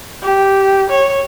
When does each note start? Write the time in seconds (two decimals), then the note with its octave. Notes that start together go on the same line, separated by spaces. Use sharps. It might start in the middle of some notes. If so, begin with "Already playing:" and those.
0.22 G4
0.90 C#5